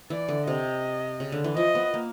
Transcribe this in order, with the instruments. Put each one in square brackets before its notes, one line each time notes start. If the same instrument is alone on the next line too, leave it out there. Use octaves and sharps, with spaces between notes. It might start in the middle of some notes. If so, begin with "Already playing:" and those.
[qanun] E3 [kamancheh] D5
[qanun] D3
[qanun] C3 [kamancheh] D#5
[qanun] C#3
D3
E3
[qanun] F3 [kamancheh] D#5
[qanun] B3
A#3